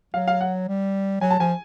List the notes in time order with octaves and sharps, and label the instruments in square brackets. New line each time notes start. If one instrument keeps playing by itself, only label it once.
[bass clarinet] F#3 [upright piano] F5
[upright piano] F5
F#5
[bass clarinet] G3
[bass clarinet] F#3 [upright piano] G#5
[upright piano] A5
[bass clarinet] F3 [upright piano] G#5